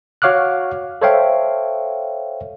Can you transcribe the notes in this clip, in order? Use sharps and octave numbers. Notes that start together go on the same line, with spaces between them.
F#4 C#5 F5 D6 F6 F#6
A4 C5 C#5 E5 F5 G5